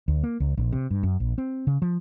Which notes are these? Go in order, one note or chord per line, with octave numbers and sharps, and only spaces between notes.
D2
A#3
C#2
A#1
C3
G2
F#2
A#1
C4
C#3
F3